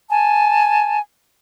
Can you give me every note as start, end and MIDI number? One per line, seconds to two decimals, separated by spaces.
0.09 0.98 80
0.09 0.98 81